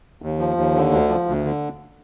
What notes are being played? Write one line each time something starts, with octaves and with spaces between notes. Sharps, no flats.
D#2
F3
D#2
D3
D2
F3
D2
D3